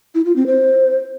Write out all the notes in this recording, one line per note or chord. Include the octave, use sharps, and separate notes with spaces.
E4
F4
C4
C5